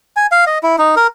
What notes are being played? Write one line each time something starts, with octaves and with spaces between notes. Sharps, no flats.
G#5
F5
D#5
E4
D#4
A#4